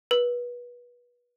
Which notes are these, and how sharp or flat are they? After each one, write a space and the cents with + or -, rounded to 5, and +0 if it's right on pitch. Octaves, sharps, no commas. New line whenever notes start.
B4 -25